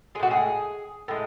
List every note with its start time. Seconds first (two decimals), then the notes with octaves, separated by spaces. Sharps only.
0.15 G#3 G#4
0.19 A2 F#4
0.31 G#4
1.08 A2 G#3